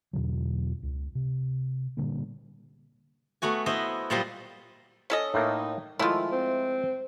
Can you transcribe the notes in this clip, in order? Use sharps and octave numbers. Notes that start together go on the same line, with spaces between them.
E2 B2 D3 F#3
C#2
C3
A#2 D3 G3 A#3
A3 B3 F#4 G#5
B3 E4 C5 D#5
A#2 F#3 G3 F4 C5 D#5
C#4 A4 D#5
A2 A3 A#3 D#4
D#3 F3 G#3 A3 E4 F4
C4